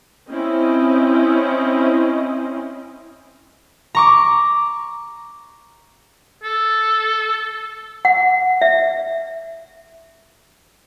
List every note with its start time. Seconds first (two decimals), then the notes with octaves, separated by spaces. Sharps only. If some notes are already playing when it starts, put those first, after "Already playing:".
0.30 C4 C#4 E4 D#5
3.95 A#5 C#6 D6
6.43 A4
8.05 F#5
8.62 E5